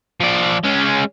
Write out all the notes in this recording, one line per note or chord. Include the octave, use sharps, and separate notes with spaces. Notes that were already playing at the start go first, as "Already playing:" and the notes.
F3 D5
G#3 C#4